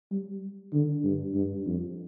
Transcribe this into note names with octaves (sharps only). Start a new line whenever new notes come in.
G3
D3
G2
G2
F2